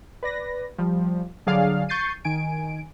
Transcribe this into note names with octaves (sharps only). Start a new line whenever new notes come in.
B4 D5 A#6
F3 G3
G1 D3 F#3 G#4 D5 F5
C#6 G6 A6 C7 D#7
D#3 G#5 D7